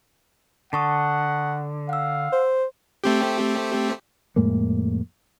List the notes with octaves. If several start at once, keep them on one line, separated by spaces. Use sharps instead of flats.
D3 F#5 A5 C#6 D#6
F5 F#5 E6
C5
A3 C4 G4
F2 A2 G#3 A#3